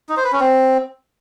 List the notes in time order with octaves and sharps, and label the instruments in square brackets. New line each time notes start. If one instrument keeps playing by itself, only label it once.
[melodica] D#4
C5
B4
C#4
C4